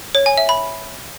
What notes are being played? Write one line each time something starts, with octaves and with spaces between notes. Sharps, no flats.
C#5
G#5
E5
B5